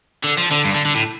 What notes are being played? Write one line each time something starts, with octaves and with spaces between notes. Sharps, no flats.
D3
F3
D3
G2
D3
D3
A2